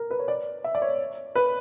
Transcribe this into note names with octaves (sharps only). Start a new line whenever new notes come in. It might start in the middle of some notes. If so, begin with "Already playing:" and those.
Already playing: A#4
B4
C#5
D5
E5
D5
C#5
B4